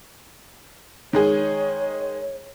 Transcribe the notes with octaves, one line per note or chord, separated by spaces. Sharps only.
D#3 G#3 G#4 C#5